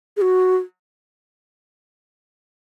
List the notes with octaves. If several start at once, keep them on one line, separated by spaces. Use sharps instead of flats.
G#4
F#4